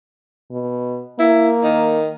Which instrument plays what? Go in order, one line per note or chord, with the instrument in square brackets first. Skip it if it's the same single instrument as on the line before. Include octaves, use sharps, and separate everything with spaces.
[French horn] B2
[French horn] A#3 [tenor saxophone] E4
[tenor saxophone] D#3